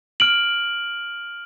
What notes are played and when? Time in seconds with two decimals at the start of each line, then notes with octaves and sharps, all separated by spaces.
0.20 F6 D7 F#7